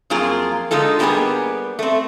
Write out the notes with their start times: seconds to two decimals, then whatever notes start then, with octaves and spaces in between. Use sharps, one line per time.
0.10 F2 F#3 A#3 F4 G#4
0.71 D3 G#3 D#4 F4 A4
0.99 F#3 G3 A#3 B3 G4 G#4
1.79 A3 C4